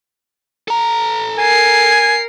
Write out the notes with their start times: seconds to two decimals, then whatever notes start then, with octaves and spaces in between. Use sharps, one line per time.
0.68 A4 A#5
1.38 A#4 G#5 C7